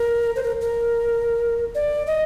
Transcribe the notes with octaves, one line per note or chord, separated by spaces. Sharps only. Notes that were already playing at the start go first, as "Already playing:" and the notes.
Already playing: A#4
C5
A#4
A#4
D5
D#5